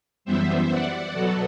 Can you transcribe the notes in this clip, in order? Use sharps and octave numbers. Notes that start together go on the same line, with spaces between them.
F#2 E3 G3 B3 C5 E5
D5 F#5
B2 F#3 B3 F#4 A4